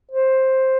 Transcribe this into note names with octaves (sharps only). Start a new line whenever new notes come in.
C5